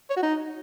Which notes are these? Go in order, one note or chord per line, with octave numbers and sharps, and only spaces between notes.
C#5
F#4
D#4